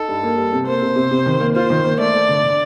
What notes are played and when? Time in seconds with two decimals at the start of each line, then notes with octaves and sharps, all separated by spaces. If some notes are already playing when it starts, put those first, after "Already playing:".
Already playing: D#4 A4
0.08 G2
0.23 A#3
0.37 G3
0.53 C3
0.67 A#3 C5
0.82 C3
0.96 C3
1.11 C3
1.26 D#3
1.40 A#3
1.55 F4 C5
1.70 D#3
1.84 A#3
1.99 A3 D5
2.15 A3
2.29 D3
2.43 D3